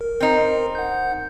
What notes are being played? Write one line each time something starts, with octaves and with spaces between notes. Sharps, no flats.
A#4
C4 D#4
F#5 G6